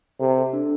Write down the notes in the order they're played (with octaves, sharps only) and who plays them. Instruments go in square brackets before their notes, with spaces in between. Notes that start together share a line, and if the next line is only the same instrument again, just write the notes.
[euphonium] C3 [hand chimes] A4
[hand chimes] A4
D4